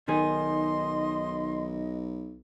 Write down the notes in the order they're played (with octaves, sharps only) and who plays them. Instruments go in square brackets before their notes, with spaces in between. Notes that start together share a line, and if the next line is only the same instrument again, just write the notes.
[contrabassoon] B1 [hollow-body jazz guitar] D#3 G#4 [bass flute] D#5 [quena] C6